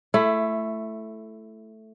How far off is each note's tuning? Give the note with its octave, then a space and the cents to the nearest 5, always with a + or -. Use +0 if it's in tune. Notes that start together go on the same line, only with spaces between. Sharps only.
A3 +0 E4 +20